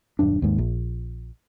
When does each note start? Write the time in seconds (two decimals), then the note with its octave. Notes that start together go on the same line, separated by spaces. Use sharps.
0.19 D#1 F#2 D4
0.42 D#2 G#2
0.58 A#1